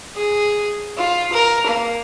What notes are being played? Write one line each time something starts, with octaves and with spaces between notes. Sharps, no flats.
G#4
F4
A#4
A#3